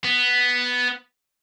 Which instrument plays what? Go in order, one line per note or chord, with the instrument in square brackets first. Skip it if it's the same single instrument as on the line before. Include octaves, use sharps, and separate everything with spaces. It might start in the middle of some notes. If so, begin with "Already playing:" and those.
[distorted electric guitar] B3